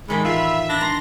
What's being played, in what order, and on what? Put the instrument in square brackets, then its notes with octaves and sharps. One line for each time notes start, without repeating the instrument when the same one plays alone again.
[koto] A2 D#3 E3 [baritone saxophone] G#3 [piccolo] B5
[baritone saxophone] F4 [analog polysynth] E5
[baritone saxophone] D4 [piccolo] B5 [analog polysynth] A#6
[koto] A#5 [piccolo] C6